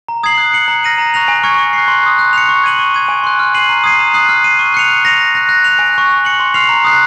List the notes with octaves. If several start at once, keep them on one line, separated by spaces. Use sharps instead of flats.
A#5
D#6 G#6 C7 F#7
F#6
C#7 F#7
A#5
F6 A#6 D#7 F#7
A#5
C#6 F#6 A#6 F7
G#5
C#6 F6 G#6 C#7
C#6
F#6 C7
C6
D#6 F#6
F#6
C#7 F7
C#6
G#6 D#7 F#7
C#6
G#6 D#7
G#5
C6 F#6
F6
C7 D#7 F#7
A#5
D#6 G#6 C7 D#7
A#5
D#6 F#6 C7 F#7
F6
C7 D#7
C#6
F#6 C#7 F7
F6
A#6 F7
C#6
F#6 A#6 F7
F#6
A#6 F7
G#5
C#6 F#6
F#6
C#7 F#7
C6
F6 C7 F7
A#5
D#6 F#6 C7